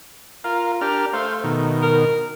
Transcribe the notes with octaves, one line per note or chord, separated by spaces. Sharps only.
F4 A#4 F5
D4 G4 A#4 F6
A3 C5 F5
B2 D#3
A#4